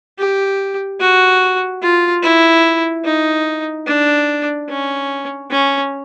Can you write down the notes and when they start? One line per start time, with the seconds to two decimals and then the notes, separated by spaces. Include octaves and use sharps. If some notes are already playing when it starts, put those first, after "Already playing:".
0.19 G4
1.00 F#4
1.82 F4
2.23 E4
3.05 D#4
3.87 D4
4.69 C#4
5.50 C#4